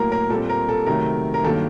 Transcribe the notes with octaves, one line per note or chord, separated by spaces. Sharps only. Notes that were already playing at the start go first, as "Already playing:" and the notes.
Already playing: A2 F#3 A#3 A#4
A#4
A#2 G3 C4 A4
A#4
A4
C3 D#3 F#3 A3 A#4
A#4
G2 D#3 F#3 A#3 A4